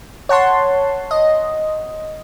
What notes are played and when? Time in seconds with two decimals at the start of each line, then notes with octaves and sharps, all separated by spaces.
0.29 C#5 F#5 A5 C6
1.11 D#5